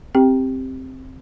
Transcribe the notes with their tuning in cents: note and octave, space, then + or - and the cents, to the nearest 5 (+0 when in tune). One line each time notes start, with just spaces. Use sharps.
C4 +0 G4 +0 G5 +0